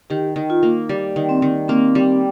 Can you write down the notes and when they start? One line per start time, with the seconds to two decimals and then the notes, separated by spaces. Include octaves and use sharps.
0.10 D#3 G4
0.36 D#3
0.50 F4
0.63 A#3
0.89 G3
1.16 D#3
1.29 C4
1.42 D#3
1.68 A#3 C4
1.95 G3